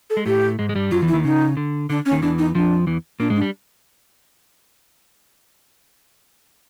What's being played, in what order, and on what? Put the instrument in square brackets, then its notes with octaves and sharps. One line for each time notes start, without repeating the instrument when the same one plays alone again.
[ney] A4
[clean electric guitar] G#3
[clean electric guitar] A2 A3 [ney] G4
[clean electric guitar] G#2 G#3
G#3
G2 G3
[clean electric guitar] F#2 F#3 [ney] F4
[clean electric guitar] E2 E3
[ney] E4
[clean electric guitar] D#2 D#3
[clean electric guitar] C#3 [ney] D#4
[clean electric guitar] D3
[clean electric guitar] D3 [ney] D4
[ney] C#4
[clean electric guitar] D#2 D#3
[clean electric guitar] E2 E3 [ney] D4
[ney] D#4
[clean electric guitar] F2 F3 [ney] D4
[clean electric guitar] E2 E3
[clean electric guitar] A#2 A#3 [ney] D4
[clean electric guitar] G#2 G#3
[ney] D4
[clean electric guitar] G3